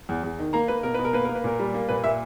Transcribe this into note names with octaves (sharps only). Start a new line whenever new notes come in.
E2
E2
D#3
A#3 A#5
A#3 B4
B2 A#4
B2 B4
A#4
A#3 B4
A#3 A#4
B4
A#2 A#4
G3
A#3
A#2 B4
A#2 E5